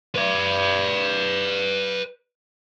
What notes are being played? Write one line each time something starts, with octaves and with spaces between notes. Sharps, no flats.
B4 D5